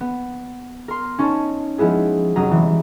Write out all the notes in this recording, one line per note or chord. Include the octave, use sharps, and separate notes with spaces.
B3
A#4 C6
C#4 D#4 C#5 A5
F3 G#3 B3 E4 G#4
F1 F#3 C#4 A#5 D#6
E3 G3 G#3